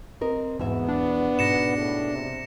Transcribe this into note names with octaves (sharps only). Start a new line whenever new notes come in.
C4 A#4 D#5
E2 G#2 B2 B3 E5
D4
G#2 B2 A#6 C#7 E7
A2
C3